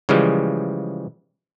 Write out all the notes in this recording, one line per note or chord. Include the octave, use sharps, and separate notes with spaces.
C#3 E3 F3 G3 G#3